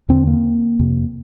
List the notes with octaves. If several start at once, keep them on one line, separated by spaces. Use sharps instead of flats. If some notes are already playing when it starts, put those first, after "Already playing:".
E2 D3 C4
A#3
F2 C3